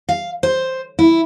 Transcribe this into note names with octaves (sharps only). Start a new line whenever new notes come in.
F5
C5
E4